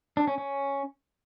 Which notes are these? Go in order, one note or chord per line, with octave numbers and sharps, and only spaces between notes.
D4
C#4
C#4